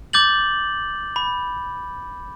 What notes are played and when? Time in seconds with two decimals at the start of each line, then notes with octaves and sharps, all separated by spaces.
0.13 D6 G6 A6 F#7
1.16 B5